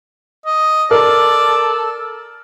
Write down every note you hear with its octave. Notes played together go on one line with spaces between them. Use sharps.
D#5
A4 A#4 D5